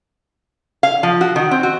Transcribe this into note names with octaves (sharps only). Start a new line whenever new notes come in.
F5
F3
F#4
D#3
C4
F#4